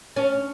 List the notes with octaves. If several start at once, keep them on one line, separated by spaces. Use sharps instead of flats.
C#4